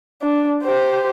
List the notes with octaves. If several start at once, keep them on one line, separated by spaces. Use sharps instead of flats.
D4
G4 C5